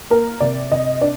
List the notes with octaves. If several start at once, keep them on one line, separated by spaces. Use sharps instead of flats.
A#3 A#4
C3 D5
C3 D#5
D4 D5